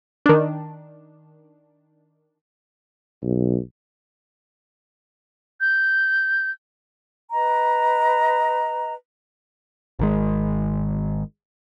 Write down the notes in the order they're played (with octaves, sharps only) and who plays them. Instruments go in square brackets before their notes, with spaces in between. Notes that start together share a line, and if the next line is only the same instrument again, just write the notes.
[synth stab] D#3 D4
[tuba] B1
[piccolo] G6
[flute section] B4 D#5 A#5
[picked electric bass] G#1 D#3 G#3